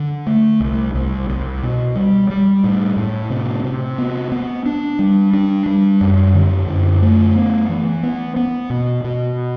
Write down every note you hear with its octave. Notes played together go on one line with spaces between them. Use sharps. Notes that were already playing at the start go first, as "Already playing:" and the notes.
Already playing: D3
A3
C2
C2
C2
B2
G3
G3
A2
A2
C3
C3
B3
B3
D4
G3
D4
G3
F#2
D3
F#2
A3
B3
E3
B3
B3
B2
B2